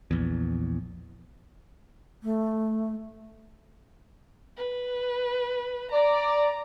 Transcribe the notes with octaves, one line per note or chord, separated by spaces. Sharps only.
A#1 E2
A3
B4
D5 A#5